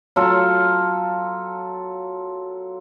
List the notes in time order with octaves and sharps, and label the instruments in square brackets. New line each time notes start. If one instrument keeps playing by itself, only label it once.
[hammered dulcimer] F#3 F4 A4